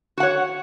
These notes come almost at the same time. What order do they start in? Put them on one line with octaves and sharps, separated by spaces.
F#4 F#5 C#5